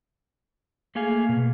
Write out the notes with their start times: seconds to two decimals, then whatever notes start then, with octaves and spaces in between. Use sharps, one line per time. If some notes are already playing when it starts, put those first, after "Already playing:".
0.95 A3 A#3 G#4 F5 G#5
1.29 B2